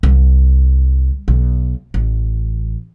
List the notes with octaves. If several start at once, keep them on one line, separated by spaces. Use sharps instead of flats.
C2
B1
A1